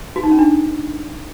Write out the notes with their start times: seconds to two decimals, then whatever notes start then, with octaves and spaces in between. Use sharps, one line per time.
0.16 F#4
0.23 D#4
0.31 C#4
0.39 D4